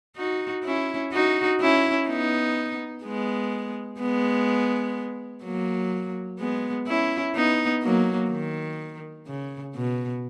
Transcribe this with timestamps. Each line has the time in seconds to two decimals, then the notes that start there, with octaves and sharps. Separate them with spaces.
0.16 D#4 F#4
0.64 C#4 E4
1.13 D#4 F#4
1.61 C#4 E4
2.08 B3 D#4
3.04 G#3 B3
4.00 G#3 B3
5.44 F#3 A#3
6.39 G#3 B3
6.87 C#4 E4
7.35 B3 D#4
7.83 F#3 A#3
8.31 D#3
9.27 C#3
9.75 B2